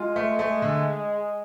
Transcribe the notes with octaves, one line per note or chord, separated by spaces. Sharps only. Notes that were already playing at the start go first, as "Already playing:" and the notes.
Already playing: G#3 F4
A3
A3
D3